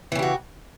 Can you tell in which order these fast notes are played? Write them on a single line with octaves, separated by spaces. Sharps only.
E3 C#3 G4 F#4